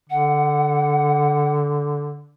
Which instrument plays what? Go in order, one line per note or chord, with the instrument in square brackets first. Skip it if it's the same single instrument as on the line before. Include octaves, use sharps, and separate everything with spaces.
[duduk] D3 [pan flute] F#5